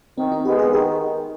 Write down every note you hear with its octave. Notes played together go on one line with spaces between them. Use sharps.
D#3 C4
D#4
G#3 B3 G4
G#4
D#3 G#4